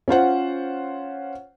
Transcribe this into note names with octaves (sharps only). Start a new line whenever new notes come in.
C#4 F4 C5 F#5